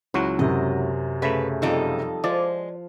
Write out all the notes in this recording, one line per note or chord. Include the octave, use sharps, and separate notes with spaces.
C#2 F#3 E4 F#4
F#2 C3 D#5
C#3 A3 B4 E5
F2 G3 D#4 F4 A4
F3 G#3 D5